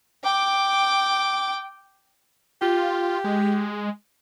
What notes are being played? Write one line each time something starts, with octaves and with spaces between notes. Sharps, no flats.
G5 D6
F4 G4
G#3